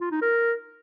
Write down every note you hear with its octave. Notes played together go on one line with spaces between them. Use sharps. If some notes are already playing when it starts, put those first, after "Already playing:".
F4
D#4
A#4